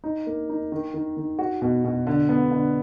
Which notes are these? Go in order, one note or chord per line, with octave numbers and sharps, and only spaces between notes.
D#4
A#3
D#4
D#3
D#3
D#3
F#4
B2
B2
D3
B3
D3